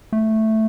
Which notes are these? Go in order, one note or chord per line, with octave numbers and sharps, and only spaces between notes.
A3